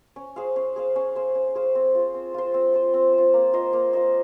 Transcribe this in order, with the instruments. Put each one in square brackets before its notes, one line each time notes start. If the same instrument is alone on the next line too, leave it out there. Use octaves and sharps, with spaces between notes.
[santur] C#4
G#4 C5 F5
C#4
G#4 C5 F5
C#4
G#4 C5 F5
C#4
G#4 C5 F5
C4
F4 C5
C4
F4 C5
C4
F4 C5
C4
F4 C5
A#3
F4 C5 D#5
A#3
F4 C5 D#5